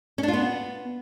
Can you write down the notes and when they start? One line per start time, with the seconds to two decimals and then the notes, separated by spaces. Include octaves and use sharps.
0.18 C#4
0.23 D4
0.28 F4
0.34 B3